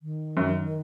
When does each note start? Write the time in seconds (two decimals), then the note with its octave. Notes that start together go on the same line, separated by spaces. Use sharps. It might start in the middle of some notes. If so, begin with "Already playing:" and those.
0.02 D#3
0.37 F#2